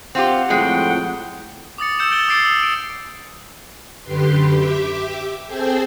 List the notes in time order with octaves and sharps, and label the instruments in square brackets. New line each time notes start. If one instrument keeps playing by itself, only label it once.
[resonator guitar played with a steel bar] C4 F4 G4 [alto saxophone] F#5
[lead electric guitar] F2 A2 [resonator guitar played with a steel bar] G#3 [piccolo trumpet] G5
[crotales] D6 D#6 A6 C#7
D#6 E6 G6 C#7 E7
G6 A6 D7 G7
D6 E6 A6 C7 D7
D#6 E6
D7
[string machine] F#2 D3 G4 B4 C6
G4 E5 D6
C4 G#4 A4 C5 G5 G#5